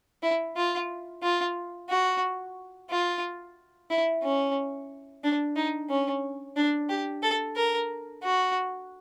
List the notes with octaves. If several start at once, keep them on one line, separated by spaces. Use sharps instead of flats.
E4
F4
F4
F#4
F4
E4
C#4
D4
D#4
C#4
D4
G4
A4
A#4
F#4